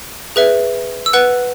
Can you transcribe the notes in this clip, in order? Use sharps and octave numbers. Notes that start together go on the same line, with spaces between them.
G#4 B4 E5
E6
B4 F#5 F#6